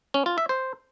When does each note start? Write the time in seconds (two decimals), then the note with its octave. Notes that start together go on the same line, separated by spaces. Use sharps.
0.14 C#4
0.26 F4
0.38 E5
0.49 C5